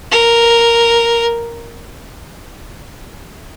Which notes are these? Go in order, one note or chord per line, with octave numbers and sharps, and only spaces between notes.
A#4